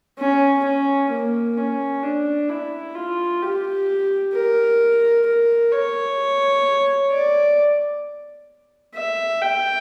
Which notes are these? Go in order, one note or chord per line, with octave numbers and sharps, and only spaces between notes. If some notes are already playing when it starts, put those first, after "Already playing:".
C#4
C#4
A#3
C#4
D4
E4
F4
G4
A#4
A#4
C#5
D5
E5
G5